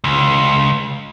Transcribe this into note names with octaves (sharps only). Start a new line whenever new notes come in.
C#2